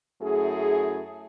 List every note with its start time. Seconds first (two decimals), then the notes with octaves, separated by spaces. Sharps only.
0.22 F#2 A3 E4 G#4